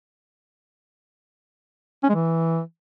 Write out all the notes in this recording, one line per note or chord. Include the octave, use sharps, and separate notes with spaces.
C#4
G#3
E3